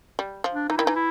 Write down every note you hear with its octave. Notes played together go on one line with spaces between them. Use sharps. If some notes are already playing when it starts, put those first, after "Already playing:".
G3
F3
D4
E3 D#4
D#3 E4
E3 D#4
E4